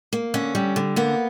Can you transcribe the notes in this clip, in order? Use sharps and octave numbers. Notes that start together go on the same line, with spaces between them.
A#3
D3 C#4
G3
D3
A#3 B3